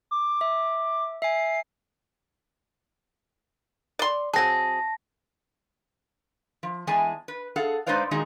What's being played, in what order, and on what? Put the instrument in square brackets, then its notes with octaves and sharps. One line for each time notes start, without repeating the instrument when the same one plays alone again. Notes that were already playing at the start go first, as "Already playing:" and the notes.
[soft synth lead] D6
[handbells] E5
[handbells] E5 G#5 [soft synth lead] C7
[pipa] D5 C6
[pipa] F#3 C4 G#4 [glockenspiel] A5 A#6
[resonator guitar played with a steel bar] F3
E2 G#3 G#4 G#5 A5
B4
G#4 A4 F5 F#5
G#3 D#4 B4 C5 D5 F5
A#2 D#3 G#3 D#4 F#4 G#4